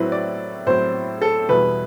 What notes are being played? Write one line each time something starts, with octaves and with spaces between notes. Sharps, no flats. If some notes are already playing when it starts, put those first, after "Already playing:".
Already playing: A2 F#3 C4 E4 B4
D5
A2 F#3 C4 E4 C5
A4
E2 B2 G3 B3 E4 B4